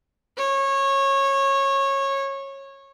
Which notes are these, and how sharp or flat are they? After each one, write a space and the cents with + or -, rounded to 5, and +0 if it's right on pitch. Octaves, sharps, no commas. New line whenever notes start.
C#5 -20